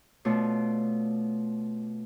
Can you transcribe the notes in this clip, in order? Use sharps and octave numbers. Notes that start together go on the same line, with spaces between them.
B2 A3 D4 F4 C#5